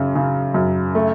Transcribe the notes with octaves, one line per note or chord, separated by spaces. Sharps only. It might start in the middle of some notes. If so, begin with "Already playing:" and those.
Already playing: F#2 C#3
C#3
F#2
A3